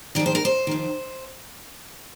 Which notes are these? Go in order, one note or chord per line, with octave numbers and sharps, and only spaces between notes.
F2 D#3 D5
C5
A#4
C5
F2 D#3